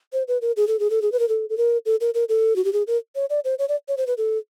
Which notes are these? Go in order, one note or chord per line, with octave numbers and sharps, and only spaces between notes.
C5
B4
A#4
G#4
A4
G#4
A4
G#4
B4
A#4
A4
A4
A#4
A4
A#4
A#4
A4
F#4
G4
G#4
A#4
C#5
D5
C5
C#5
D5
C#5
C5
B4
A4